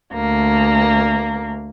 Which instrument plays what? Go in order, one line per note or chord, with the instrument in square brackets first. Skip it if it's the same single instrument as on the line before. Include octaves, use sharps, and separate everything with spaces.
[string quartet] D2 A#3